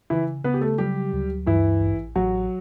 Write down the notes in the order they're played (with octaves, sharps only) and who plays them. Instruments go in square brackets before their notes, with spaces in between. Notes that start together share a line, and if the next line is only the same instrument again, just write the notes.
[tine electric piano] C#3 [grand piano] E3 E4
[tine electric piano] C#3 [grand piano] B3 B4
[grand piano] G4
A3 A4
[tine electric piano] F#3 [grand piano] G3 G4
[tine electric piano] D2
[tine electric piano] G2 [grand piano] E3 E4
[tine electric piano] A1
[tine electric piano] A1 [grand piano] F#3 F#4